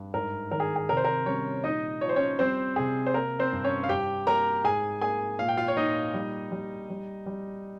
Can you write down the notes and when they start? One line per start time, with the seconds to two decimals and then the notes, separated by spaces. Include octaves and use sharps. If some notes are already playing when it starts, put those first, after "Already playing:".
Already playing: G2
0.14 G#2 A#4
0.52 D#3 A#4
0.60 G#4
0.76 G#4
0.89 C3 A#4
0.97 C5
1.05 A#4
1.26 G3 C#4 C#5
1.64 A#2 D#4 D#5
2.01 F3 C#5
2.09 C5
2.16 C#4 C#5
2.39 G3 C4 C5
2.76 C3 G#4
3.06 C5
3.14 A#3 A#4
3.39 C4 C5
3.52 G2
3.64 C#4 C#5
3.84 F5
3.89 G2 G4 G5
4.27 A#3 A#4 A#5
4.64 G#2 G#4 G#5
5.01 A#3 G#4 G#5
5.39 A#2 F5
5.48 G5
5.57 F4 F5
5.68 C#5
5.77 A#2 D#4 D#5
6.14 G3
6.52 G3
6.89 G3
7.26 G3